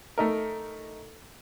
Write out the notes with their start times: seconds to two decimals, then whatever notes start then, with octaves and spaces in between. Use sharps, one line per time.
0.18 A3 D#4 A#4